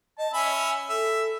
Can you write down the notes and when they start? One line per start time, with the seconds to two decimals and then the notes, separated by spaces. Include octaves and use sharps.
0.19 D#5 A5
0.33 C#4 E5 G#5 B5
0.89 A4 E5